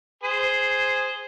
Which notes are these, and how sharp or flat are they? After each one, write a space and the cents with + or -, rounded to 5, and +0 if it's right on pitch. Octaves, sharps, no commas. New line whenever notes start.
G#4 +0 C5 -5